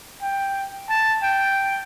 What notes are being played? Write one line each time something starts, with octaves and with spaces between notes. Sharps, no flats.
G5
A5
G5